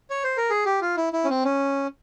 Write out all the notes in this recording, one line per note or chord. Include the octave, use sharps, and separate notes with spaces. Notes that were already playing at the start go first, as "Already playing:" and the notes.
C#5
C5
A#4
G#4
G4
F4
E4
E4
C#4
C4
C#4